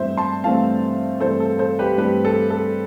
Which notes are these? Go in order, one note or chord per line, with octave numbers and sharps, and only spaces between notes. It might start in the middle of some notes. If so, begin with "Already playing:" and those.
Already playing: G2 E3 A3 C4 C5 E5
A5 C6
G2 E3 A3 C4 F5 A5
G2 E3 A3 C4 A4 C5
A4
A4 C5
G4 B4
G2 E3 A3 C4 G4 B4
A4
A4